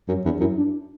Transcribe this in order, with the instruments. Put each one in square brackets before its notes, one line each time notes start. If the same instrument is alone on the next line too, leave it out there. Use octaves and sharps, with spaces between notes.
[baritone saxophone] F#2 [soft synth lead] C#4
[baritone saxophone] E2 [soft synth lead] D4
[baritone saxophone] F#2 [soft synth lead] E4
[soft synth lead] D4